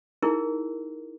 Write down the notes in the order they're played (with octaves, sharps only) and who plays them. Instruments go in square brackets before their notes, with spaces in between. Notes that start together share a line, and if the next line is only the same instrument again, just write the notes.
[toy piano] D#4 E4 G#4 A#4